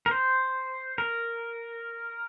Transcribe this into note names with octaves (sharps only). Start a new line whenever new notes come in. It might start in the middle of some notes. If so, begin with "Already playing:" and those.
A#4
C5
A#4